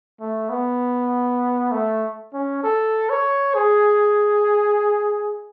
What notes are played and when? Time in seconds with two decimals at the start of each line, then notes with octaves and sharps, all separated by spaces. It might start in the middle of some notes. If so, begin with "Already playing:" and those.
0.20 A3
0.49 B3
1.72 A3
2.33 C#4
2.63 A4
3.09 C#5
3.55 G#4